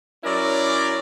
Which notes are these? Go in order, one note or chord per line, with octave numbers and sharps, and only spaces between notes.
F#3 C#4 E4 A#4 D5